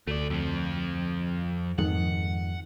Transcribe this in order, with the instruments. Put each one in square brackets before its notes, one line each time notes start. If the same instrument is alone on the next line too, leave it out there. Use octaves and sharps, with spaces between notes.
[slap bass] D2 [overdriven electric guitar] A3 D5
[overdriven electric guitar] F2 F3
[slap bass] F2 G#2 D#3 [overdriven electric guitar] F#5